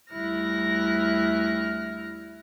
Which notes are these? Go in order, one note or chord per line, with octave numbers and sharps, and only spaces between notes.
D2 G3 E4 F6 F#6 A#6